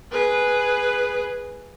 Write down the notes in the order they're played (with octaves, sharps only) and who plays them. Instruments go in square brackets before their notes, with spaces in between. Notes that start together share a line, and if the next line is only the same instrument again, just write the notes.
[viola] G#4 B4